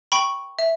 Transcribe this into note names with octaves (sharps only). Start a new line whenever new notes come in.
G5 B5 C#6
E5